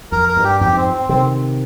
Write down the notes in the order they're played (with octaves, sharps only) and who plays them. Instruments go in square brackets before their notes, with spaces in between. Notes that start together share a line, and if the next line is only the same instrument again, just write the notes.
[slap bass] F2 [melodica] A#4
[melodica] A#4
[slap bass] G2
[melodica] G4
[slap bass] F2 G#2 [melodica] G4
[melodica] C4
C4
[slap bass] C3 D#3 [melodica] C4